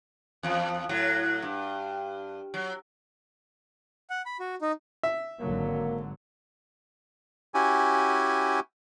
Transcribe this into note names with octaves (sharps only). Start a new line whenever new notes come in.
E2 F3
A2 F#3
G2
F#3
F#5
B5
F#4
D#4
E5
G#1 D3 F#3 A#3
C#4 E4 F#4 G4 G#5